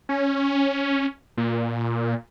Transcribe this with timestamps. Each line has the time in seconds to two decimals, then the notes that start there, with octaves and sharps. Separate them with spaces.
0.09 C#4
1.37 A#2